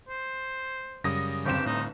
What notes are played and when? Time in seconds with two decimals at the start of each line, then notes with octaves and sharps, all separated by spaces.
0.09 C5
1.04 F#2 C#3 G3 D#6 A#6
1.46 G1 C4 G4 E7
1.66 A2 D#4